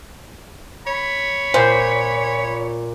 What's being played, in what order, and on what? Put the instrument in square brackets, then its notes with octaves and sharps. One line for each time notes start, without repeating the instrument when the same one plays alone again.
[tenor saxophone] C#5 [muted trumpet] B5
[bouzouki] A#2 [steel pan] C5